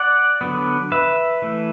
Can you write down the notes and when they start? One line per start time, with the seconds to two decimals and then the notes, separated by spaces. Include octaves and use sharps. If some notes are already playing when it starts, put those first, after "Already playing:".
Already playing: D5 F#5
0.41 D3 F#3 B3
0.92 B4 E5
1.42 E3 A3